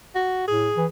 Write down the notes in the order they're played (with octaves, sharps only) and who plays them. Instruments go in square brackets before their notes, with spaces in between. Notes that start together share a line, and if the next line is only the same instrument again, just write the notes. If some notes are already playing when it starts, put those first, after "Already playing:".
[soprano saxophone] F#4
[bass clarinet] A2 [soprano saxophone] G#4
[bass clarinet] E3